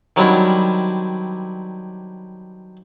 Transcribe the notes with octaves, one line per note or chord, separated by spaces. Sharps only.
D#3 F#3 G3 C4 D4 E4